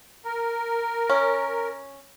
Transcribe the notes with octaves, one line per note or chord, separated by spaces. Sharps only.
A#4
C#4